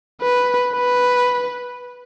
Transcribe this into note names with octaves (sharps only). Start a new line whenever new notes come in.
B4
B4